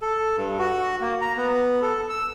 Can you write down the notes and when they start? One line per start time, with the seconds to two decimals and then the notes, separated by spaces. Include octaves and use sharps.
0.02 A4
0.37 G2
0.59 F#4
1.01 A#3
1.21 A#5
1.37 B3
1.82 A4
2.10 E6